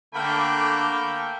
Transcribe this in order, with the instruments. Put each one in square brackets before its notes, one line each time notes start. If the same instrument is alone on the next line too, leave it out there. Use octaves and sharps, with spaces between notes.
[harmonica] D3 B5 [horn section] A3 A#3 G5